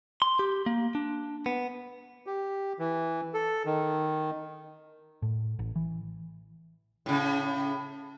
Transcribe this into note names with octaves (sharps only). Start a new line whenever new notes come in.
C6
G4
A#3
D4
B3
G4
E3
A4
D#3
A2
A1
E3
A2 C#3